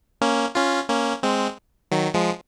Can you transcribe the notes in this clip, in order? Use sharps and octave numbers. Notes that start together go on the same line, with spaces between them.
A#3 C#4
C#4 F4
A#3 C#4
G#3 C4
D#3 F#3
F3 G#3